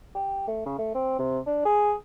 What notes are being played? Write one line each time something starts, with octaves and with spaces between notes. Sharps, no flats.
G4
A3
C#3
A3
C4
C3
D4
G#4